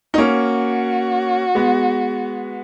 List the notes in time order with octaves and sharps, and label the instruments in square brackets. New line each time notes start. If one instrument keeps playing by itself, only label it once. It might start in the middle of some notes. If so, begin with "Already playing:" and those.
[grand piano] D#4
[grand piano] A#3 C#4 [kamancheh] F#4
[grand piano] G#3 B3